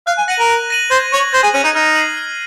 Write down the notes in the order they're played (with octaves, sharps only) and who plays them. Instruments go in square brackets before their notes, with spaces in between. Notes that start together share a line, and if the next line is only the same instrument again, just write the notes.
[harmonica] F5 [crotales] F#6
[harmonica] G#5
[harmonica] F#5 [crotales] A#6 D#7 F#7
[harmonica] A#4
[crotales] F#6
A#6 D#7 F#7
[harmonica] C5 [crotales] G#6
[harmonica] C#5 [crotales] D#7
[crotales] F#7
[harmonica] C5 [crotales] G#6
[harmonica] G#4
[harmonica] C#4 [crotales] D#7 F#7
[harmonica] D#4
[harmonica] D#4 [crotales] F6
[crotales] C7 D#7 F#7
F6